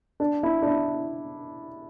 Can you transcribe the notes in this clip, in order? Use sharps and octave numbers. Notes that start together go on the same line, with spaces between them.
D4
E4
D4
E4